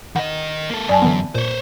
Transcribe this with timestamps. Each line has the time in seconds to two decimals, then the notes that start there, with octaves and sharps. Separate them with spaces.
0.16 D#3 D#5 F#5
0.70 A#3 A4
0.89 F#2 D5 G#5 A5
1.02 D3 E3 B3
1.35 A#2 C5 C#5